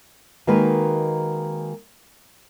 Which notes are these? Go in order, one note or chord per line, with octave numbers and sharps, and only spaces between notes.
D#3 G#3 A#3 F#4 A#4 B4